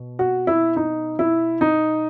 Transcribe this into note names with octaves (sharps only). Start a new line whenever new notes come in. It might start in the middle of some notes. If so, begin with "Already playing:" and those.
Already playing: B2
F#4
E4
D#4
E4
D#4